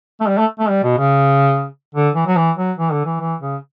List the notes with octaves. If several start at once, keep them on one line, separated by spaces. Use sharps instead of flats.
A3
G3
A3
A3
G3
B2
C#3
D3
E3
F#3
E3
F#3
E3
D3
E3
E3
C#3